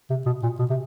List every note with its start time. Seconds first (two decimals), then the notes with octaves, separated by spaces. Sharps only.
0.10 C3
0.26 B2
0.43 A#2
0.59 B2
0.70 C3